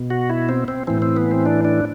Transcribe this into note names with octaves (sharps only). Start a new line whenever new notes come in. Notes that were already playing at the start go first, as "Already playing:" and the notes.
Already playing: B2
F#4
E4
C4
C4
A2 E3 C4
C4
B3
C4
D4
D4